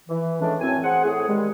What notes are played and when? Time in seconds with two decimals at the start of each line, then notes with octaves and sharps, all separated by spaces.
0.09 E3
0.41 A2 D3 G#3 A3 C#4 D4
0.61 F#2 A2 C4 G#5
0.84 G#4 C5 F#5
1.04 A2 G#4
1.28 D#3 G3 G#3